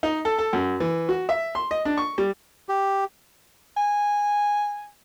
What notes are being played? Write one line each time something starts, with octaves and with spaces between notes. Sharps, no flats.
D#4
A4
A4
F#2
E3
F#4
E5
C6
D#5
D4
C#6
G3
G4
G#5